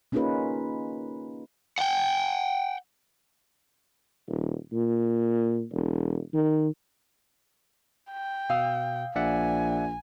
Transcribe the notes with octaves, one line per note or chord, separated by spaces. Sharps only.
A#3 C#4 D#4 F4 G#4 B4
F#5 G5
D#1
A#2
E1
D#3
G5
B2 F5 D#6 E6
A#1 D5 E5 F#5 G#5